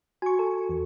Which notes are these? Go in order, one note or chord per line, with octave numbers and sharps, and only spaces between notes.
F#4 G#5 C#6
A4
E2